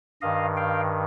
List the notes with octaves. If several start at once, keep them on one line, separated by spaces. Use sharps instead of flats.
G2 D#3 D#5 F5
F5 G5